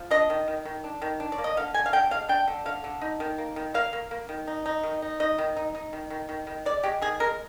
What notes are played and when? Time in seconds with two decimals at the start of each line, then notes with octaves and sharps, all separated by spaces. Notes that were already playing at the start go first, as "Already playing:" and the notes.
Already playing: F3
0.11 D4 D#5
0.30 D#3
0.48 D#3
0.65 D#3
0.84 D4
1.02 D#3
1.20 D4
1.32 D5
1.38 A#3
1.44 D#5
1.57 D3 F5
1.74 D3 G#5
1.86 F5
1.93 D3 G5
2.11 G#3 F5
2.29 D4 G5
2.48 D3
2.65 D3 F5
2.84 D3
3.01 D#4
3.20 D#3
3.38 A#3
3.56 D#3
3.74 A#3 F5
3.93 A#3
4.11 A#3
4.29 D#3
4.47 D#4
4.66 D#4
4.83 D#3
5.02 D#4
5.20 D#4 D#5
5.38 D#3
5.57 D#4
5.75 D#4
5.93 D#3
6.10 D#3
6.29 D#3
6.47 D#3
6.66 G#3 D5
6.83 G#3 G4
7.02 D#3 G#4
7.20 G#3 A#4